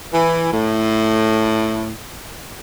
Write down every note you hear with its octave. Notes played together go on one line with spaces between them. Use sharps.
E3
A2